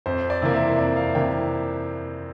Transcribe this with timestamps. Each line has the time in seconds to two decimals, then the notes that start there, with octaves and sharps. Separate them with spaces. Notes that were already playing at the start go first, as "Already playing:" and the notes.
0.06 F2 C5
0.30 D5
0.42 C3 E3 A#3
0.54 E5
0.78 F2 D5
0.96 F5
1.15 C3 E3 A#3 G5